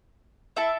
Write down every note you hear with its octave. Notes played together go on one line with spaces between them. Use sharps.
E4 A4 E5 A5